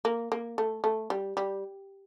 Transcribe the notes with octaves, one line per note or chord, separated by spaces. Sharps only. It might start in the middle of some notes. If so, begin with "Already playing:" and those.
A#3
A#3
A3
A3
G3
G3